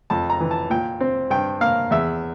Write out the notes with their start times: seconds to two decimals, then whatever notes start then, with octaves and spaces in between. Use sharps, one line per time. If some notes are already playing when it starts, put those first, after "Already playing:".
0.10 F2 A5
0.30 A#5
0.40 E3
0.51 A5
0.70 A#2 G5
1.01 C4
1.30 G2 G5
1.61 A#3 F5
1.91 E2 E5